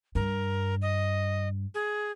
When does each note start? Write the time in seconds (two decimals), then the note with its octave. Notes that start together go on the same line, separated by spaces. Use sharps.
0.15 G2 A#4
0.82 D#5
1.75 G#4